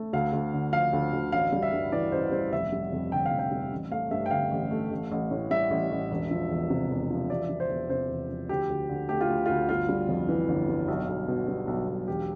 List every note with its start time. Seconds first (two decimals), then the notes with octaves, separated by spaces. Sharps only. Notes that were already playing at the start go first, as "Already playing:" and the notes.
Already playing: A3
0.13 D2 F5
0.33 D2
0.53 D3
0.72 F3 F5
0.93 D2
1.13 D2
1.32 A1 F5
1.53 G3
1.63 E5
1.73 G2
1.92 E3 D5
2.12 A1 C5
2.32 G3 C5
2.52 F1 E5
2.72 G3
2.92 F2
3.12 D3 G5
3.26 F5
3.31 F1
3.39 G5
3.52 G3
3.72 A1
3.91 A3 F5
4.11 G2 E5
4.26 G5
4.31 D3 F5
4.51 A1
4.71 A3
4.91 A1
5.12 A1
5.31 A2
5.51 G3 E5
5.71 A1
5.91 A1
6.11 E1
6.31 F3
6.50 E2
6.70 C3
6.90 E1
7.11 F3
7.30 E1 D5
7.49 F3
7.60 C5
7.70 E2
7.89 C3 C5
8.09 E1
8.29 F3
8.49 D2 G4
8.70 D2
8.89 D3
9.09 A3 G4
9.21 F4
9.29 D2
9.46 D2 F4
9.69 G1 F4
9.89 G3
10.09 F2
10.29 E3
10.48 G1
10.69 G3
10.88 B1
11.08 B1
11.28 B2
11.48 G3
11.67 B1
11.88 B1
12.08 E1 G4